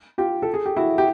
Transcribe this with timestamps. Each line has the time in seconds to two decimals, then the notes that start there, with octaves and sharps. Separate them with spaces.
0.18 F4 G4
0.42 A4
0.54 G#4
0.66 G4
0.77 E4 F#4
0.98 G4